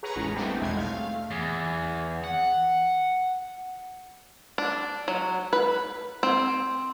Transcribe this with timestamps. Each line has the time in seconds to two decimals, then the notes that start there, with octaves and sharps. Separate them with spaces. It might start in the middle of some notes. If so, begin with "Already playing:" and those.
0.03 G#4 B4 C#5 F#5 A#5 F6
0.16 A1 E2 G#3 C#4
0.35 G3 A3 B3 C4 D4 G4
0.61 B1 E2 G#3 C6 G#6
0.73 A3 F5
1.31 E2
2.24 F#5
4.58 D4
5.08 F#3
5.53 B4
6.23 C4